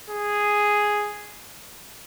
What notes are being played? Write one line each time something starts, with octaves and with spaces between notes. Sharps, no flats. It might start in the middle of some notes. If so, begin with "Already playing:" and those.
G#4